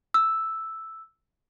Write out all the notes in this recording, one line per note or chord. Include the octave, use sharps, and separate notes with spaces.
E6